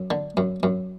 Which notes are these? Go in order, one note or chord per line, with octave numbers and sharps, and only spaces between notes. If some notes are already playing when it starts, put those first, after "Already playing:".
Already playing: F#2
D3
F#2
F#2